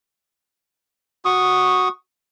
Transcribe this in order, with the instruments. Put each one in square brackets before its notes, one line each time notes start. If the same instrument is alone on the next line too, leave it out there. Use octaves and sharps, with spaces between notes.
[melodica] F#4 C#6 D#6